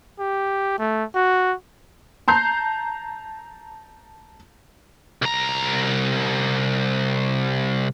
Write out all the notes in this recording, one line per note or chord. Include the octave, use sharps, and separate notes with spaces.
G4
A3
F#4
A5 A#5 G6 C7
C2 A#5